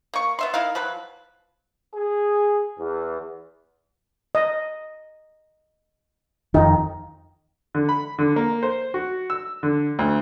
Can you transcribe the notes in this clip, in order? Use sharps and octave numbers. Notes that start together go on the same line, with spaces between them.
A#3 C#6
B3 E5 C6
D#4 E4 A#4 F5
F3 F#3 B4
G#4
E2
D#5
F2 D#3 D#4
D3
B5
D3
A#3
C5
F#4
E6
D3
D2